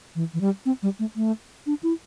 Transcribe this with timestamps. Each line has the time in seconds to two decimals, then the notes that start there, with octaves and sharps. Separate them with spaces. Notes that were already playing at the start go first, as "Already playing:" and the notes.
0.15 E3
0.34 E3
0.41 G3
0.66 C4
0.83 G3
0.99 A3
1.16 A3
1.66 D4
1.83 E4